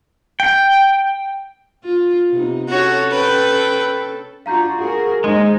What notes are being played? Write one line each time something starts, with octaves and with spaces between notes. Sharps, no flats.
G5
F4
C3 B3 D#4
C#4 F#4 A4 C#5
B4 G5
D4 F4 F#4 F5 A#5 G6
F#4 G#4 A#4
D#2 G#3 D#4 C5 C6